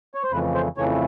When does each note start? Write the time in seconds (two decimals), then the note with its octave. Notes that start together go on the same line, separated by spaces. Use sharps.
0.14 C#5
0.23 C5
0.31 F2 C#3 E3 A3 B4
0.54 C5
0.77 F2 C#3 E3 A3 C#5